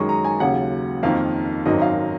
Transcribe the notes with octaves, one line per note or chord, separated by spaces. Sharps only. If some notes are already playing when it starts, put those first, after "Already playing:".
Already playing: F#2 D#3 G#3 C#6 D#6
A#5
G#5
D#2 C#3 F#3 F#5
F2 D#3 A#3 F5
G#1 F#2 D#3 D#5
F5